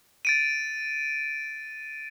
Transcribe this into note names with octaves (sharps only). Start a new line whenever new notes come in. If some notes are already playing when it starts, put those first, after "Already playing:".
A6 D7 D#7